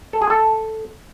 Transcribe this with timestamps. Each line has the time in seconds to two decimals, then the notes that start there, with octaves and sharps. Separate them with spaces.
0.13 A4
0.22 G#4
0.30 A4